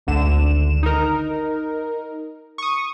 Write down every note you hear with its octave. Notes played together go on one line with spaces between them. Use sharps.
G#1 D2 D3 E7
D#4 A#4
C#6 D#6